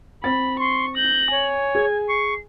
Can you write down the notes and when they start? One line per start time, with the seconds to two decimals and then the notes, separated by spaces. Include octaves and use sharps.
0.24 C4 B5 A6
0.59 C6 C#6
0.96 G6 A#6 F#7
1.32 C#5 G#5
1.75 G#4 G#6
2.09 C#6 C7